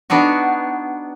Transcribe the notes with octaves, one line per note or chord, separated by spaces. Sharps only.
B3 D4 D#4 F#4